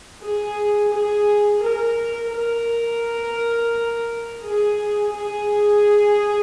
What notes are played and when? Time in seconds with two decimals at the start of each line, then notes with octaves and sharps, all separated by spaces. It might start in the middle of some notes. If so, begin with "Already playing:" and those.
0.22 G#4
0.93 G#4
1.63 A#4
2.33 A#4
4.44 G#4
5.14 G#4